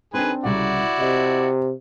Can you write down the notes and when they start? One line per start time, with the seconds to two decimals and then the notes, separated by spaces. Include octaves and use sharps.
0.14 D#3 C4 D4 G#4 B4
0.43 C2 C#3 E4 F#4 D5 F#5
1.00 C3 D#5